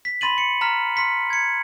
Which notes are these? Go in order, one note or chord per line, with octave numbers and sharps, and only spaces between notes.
B6
B5 C6 A6 D#7 F#7
C#7
A#5 F6 B6
C6 F6 B6 C#7
G#6 C#7